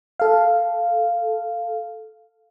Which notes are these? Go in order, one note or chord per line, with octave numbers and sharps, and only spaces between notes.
A4 F5